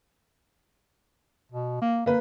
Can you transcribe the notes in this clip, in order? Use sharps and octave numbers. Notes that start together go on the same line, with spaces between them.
B2
A#3
D3 A#3 B4